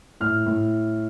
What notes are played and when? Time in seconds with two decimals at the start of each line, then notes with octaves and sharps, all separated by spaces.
0.20 A2 F6
0.46 A2